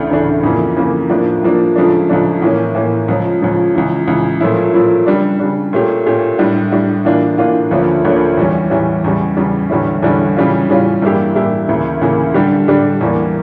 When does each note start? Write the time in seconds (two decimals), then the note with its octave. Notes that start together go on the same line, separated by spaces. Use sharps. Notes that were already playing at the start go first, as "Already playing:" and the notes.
Already playing: D2 C#3 E3 A3 D4
0.10 D2 C#3 E3 A3 D4
0.43 F2 C#3 E3 A#3
0.77 F2 C#3 E3 A#3
1.10 A2 F3 A#3 D4
1.43 A2 F3 A#3 D4
1.76 C#2 C#3 F3 A3 D4
2.09 C#2 C#3 F3 A3 D4
2.42 A2 E3 A#3 C#4
2.75 A2 E3 A#3 C#4
3.08 C#2 C#3 F3 C#4
3.42 C#2 C#3 F3 C#4
3.75 C#2 C#3 E3
4.08 C#2 C#3 E3
4.40 A#2 F3 A3 C#4 E4
4.74 A#2 F3 A3 C#4 E4
5.06 C#3 G3 D4
5.39 C#3 G3 D4
5.73 A#2 A3 C#4 G4
6.06 A#2 A3 C#4 G4
6.39 A2 G3 D4
6.72 A2 G3 D4
7.05 A2 E3 A#3 D4 F4
7.38 A2 E3 A#3 D4 F4
7.71 D2 D3 F3 A#3 C#4
8.05 D2 D3 F3 A#3 C#4
8.37 E2 E3 G3 C#4
8.70 E2 E3 G3 C#4
9.04 E2 C#3 G3
9.37 E2 C#3 G3
9.70 E2 D3 G3 C#4 E4
10.03 E2 D3 G3 C#4 E4
10.36 C#3 E3 G3 C#4 F4
10.70 C#3 E3 G3 C#4 F4
11.02 G2 E3 A#3 E4 G4
11.36 G2 E3 A#3 E4 G4
11.68 D2 C#3 E3 A#3
12.01 D2 C#3 E3 A#3
12.34 D3 G3 D4 G4
12.68 D3 G3 D4 G4
13.01 E2 E3 G3 A#3